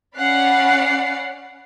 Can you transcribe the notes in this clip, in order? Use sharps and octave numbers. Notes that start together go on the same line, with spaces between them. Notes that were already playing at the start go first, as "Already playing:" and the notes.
C#4 D5 F5 F#5 B5 C7